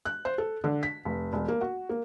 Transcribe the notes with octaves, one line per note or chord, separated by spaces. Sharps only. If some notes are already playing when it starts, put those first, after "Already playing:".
F#6
C5
A4
D3
B6
F1
E1
A#3
F#4
A#3